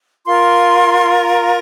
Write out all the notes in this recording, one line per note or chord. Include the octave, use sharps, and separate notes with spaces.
F4 A#4 C6
A#5